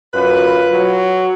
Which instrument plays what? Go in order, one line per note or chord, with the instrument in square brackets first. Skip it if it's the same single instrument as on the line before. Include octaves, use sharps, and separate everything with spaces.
[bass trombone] F#2 [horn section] F4 B4
[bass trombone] F#3